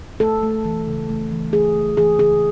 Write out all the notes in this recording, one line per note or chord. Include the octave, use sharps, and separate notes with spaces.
A3 A4
A3
E3
C#3
A3
E3
A3 G#4
A3
E3 G#4
C#3 G#4